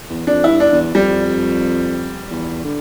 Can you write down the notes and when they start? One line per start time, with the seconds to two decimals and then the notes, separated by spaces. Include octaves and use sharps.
0.09 E2
0.27 F2 D4
0.44 G2 E4
0.60 D4
0.72 E2
0.95 F2 G3
2.30 E2
2.64 D3